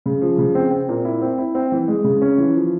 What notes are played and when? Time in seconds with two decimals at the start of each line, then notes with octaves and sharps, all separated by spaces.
0.06 C#3
0.22 F3
0.38 C#3
0.55 C4
0.71 C4
0.89 A#2
1.05 E4
1.22 C4
1.38 E4
1.55 C4
1.72 E3
1.88 G#3
2.04 C#3
2.22 C#4
2.38 E3
2.55 F3